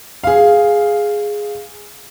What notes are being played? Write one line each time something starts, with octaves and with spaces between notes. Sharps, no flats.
G#4 F5